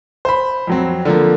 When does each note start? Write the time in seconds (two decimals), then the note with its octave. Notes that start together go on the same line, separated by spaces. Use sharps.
0.25 C5 B5
0.67 F2 F#3 C4
1.05 D3 F3 A#3